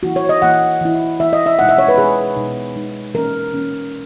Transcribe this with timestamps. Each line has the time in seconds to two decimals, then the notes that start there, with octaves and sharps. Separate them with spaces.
0.03 E3 A#3 E4 F#4
0.16 C#5
0.29 D#5
0.42 E3 A#3 E4 F#5
0.81 E3 A#3 E4
1.20 E3 A#3 E4 E5
1.33 D#5
1.46 E5
1.59 B2 G#3 D#4 F#5
1.69 E5
1.78 C#5
1.88 B4
1.98 B2 G#3 D#4 G#4
2.37 B2 G#3 D#4
2.76 B2 G#3 D#4
3.15 E3 A#3 C#4 A#4
3.54 E3 A#3 C#4